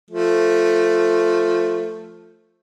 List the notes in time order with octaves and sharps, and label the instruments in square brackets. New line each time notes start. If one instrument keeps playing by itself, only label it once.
[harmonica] F3 A3